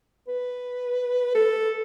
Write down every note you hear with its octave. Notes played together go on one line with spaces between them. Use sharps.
B4
A4